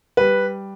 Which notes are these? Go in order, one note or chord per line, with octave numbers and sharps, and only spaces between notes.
G3 B4